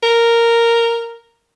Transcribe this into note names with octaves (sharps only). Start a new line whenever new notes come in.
A#4